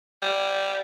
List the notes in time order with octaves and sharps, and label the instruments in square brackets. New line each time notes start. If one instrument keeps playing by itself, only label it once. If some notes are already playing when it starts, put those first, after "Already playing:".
[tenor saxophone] G3